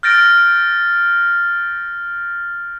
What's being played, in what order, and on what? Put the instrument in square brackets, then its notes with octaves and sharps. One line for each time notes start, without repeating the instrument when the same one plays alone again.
[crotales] F6 G6 A6 A#6 D7